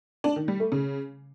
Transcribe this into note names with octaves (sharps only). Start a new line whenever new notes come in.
D4
D#3
G3
A3
C#3